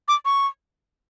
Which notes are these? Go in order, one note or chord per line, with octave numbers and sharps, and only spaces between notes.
D6
C#6